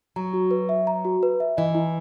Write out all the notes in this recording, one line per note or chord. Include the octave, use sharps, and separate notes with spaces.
F#3 A#5
F#4
B4
E5
A#5
F#4
B4
E5
E3 D#5
E4